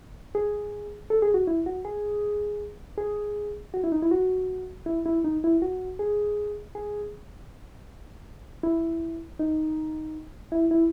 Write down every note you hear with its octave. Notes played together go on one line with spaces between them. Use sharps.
G#4
A4
G#4
F#4
E4
F#4
G#4
G#4
F#4
E4
D#4
E4
F#4
E4
E4
D#4
E4
F#4
G#4
G#4
E4
D#4
E4
E4